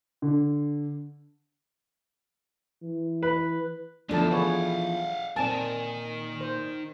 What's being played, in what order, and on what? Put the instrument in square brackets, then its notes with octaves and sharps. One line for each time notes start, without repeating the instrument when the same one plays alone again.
[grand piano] D3
[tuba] E3
[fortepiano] B4
[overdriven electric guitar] D2 [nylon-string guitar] E3 F3 B3 [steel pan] D4 A4 A5
[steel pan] G#4 B4 C#5 [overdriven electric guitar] F5 F#5
[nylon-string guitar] A#2 G#5 [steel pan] C4 A5 [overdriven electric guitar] D#4 A#4
[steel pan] C5